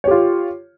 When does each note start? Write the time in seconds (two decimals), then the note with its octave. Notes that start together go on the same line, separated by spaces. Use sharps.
0.04 C#5
0.08 G4
0.11 F4